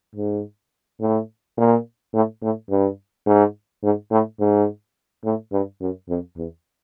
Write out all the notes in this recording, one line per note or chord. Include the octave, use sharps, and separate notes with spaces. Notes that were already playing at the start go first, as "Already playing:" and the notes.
G#2
A2
A#2
A2
A2
G2
G#2
G#2
A2
G#2
A2
G2
F#2
F2
E2